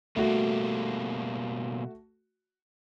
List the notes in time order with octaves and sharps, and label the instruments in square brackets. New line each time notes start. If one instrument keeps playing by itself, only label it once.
[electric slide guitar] B2 G3 A#3 [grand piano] A3 F#4